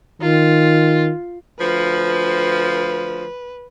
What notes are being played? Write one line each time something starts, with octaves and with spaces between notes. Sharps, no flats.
D#3 F4
D2 F3 B4